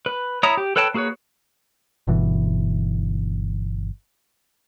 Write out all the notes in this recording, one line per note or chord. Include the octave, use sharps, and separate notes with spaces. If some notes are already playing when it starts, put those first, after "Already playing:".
B4
E4 C#5 A#5 D#6
G4
A4 B4 C#5 G5 A5
A#3 F#4 G#4 B4 C#5
G1 B2 E3